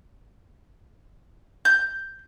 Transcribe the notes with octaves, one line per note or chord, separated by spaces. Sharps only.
G6